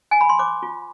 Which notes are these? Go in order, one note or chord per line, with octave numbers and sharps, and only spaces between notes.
G#5
B5
C6
C5 D6
F4